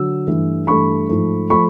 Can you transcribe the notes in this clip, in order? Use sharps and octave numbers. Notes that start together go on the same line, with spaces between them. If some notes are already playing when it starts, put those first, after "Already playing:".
Already playing: D3 F#3 E6
G2 E3 A3
G2 E3 A3 B5 C#6
G#2 F3 A3
F3 A3 B5 C#6